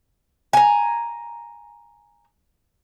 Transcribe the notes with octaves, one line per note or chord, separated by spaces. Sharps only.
G#5 A#5